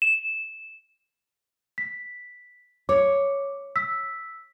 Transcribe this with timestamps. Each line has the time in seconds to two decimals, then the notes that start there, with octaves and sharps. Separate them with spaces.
0.02 E7
1.78 B6
2.89 C#5 D6
3.76 E6 B6